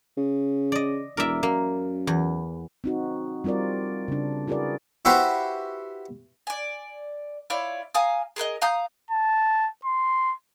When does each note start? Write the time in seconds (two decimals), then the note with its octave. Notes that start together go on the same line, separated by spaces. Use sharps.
0.18 C#3
0.72 D5 D#5
1.17 E1 A#4 D5 E5
1.43 F#2 A#3
2.07 E2
2.84 C4 D#4 F#4
3.44 G3 C4 F4 A#4 D5
4.08 C#3 D4
4.47 E4 F#4 G#4 A#4 B4 D5
5.05 E4 F#4 G4 B4 C5
6.47 D5 G#5
7.50 E4 F4 C#5 D5
7.94 F5 G#5 A#5 D#6
8.36 G#4 A#4 B4 D#5
8.62 F5 A#5 D#6 G6
9.11 A5
9.85 C6